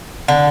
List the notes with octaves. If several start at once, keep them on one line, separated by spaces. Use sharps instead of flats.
D3